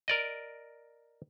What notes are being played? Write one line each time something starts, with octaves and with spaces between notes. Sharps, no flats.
A#4 D5 D#5